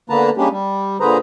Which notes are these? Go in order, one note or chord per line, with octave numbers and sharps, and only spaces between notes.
D3 A#3 B3 B4 A5 A#5
G3 G#3 A#3 C#4 D4 G4
G3
A#2 D3 G#4 B4 C5 A#5